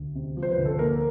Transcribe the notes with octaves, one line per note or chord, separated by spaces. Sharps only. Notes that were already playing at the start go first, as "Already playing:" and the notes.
Already playing: D2
C3
F3
C5
B4
D2
A4
A#3 A#4